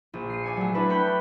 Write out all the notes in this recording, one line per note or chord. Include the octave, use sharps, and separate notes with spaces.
A#1
C7 D#7
D5 G#5 C#7
F#3 A3
D4 E4 B4
G5 B5 C#6 F#6 G6